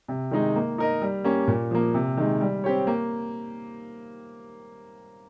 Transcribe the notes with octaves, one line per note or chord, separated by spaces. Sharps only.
C3
D#3 G#3 D#4
A#3
D#4 A#4 D#5
G3
A#3 C#4 G4
A#2
F3 A#3
C3
D#3 G#3
G3
C4 G4 C#5
A#3